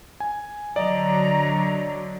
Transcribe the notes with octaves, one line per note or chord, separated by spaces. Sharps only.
G#5
D3 F#3 D5 D#5 A#5